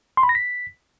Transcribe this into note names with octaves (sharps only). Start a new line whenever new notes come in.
C6
B5
A#6
B6